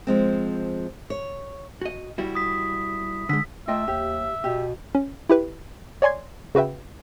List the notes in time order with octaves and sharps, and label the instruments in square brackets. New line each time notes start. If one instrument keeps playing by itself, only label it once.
[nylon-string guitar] F3 G#3 C4
C#5
[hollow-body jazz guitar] F#4 D#5
G3 E4 F#4
[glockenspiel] D#6 B6
[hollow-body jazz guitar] D3 G#3 [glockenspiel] E6 B6
[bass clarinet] A3 [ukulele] F4 D#5 G5 [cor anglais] E5
[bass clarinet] D#2 [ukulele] G4
[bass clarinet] B2 [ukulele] G4
[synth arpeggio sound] C#4
E4 G4 B4
C#5 D5 G#5 C6 G#6
C#3 F#4 B4 E5 G5